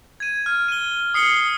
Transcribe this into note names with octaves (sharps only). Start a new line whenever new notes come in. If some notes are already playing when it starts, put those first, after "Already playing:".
G#6 D#7
F6
D#7 G7
D#6 C7 C#7 G7